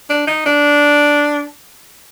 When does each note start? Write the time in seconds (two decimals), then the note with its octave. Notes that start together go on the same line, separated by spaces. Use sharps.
0.10 D4
0.27 D#4
0.46 D4